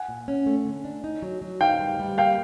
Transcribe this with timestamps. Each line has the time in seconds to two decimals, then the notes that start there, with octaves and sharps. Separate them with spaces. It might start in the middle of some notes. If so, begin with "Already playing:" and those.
Already playing: F#5 G#5
0.09 A#2
0.28 C#4
0.46 A3
0.65 D3
0.85 D4
1.04 D#4
1.22 F#3
1.42 F#3
1.61 D#4 F5 G5
1.79 G3
1.99 G3
2.17 A#3 F5 G5